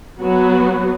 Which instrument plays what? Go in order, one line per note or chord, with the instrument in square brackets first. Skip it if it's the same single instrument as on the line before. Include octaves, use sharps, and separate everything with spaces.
[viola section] F#3 B3 F#4